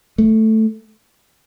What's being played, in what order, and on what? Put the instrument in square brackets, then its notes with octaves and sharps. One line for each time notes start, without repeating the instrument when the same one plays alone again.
[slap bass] A3